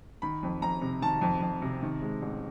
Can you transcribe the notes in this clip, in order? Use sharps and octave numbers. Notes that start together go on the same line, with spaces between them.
D#3 B5
F2
F2 A#5
C3
D#3 A5
F2
F2
C3
D#3
G#3
A1